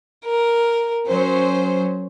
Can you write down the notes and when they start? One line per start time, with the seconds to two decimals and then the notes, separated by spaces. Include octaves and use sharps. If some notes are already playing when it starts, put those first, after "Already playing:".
0.25 A#4
1.08 F#3 C#4 C5